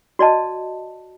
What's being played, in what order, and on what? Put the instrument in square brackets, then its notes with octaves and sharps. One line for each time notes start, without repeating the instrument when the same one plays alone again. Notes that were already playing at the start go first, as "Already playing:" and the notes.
[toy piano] F#4 D5 D#5 A5